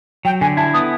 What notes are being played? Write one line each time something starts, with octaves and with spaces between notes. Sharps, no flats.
F#3 G5
D3 G#5
E4 A5
B3 D#6